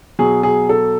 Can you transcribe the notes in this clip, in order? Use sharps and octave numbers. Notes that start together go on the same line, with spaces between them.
B2 F#3 G#4
G#4
A4